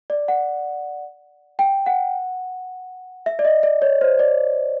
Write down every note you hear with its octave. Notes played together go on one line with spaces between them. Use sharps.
D5
F#5
G5
F#5
E5
D5
D#5
D5
C#5
C5
D5